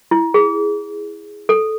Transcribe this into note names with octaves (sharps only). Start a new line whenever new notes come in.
E4
G#4
A4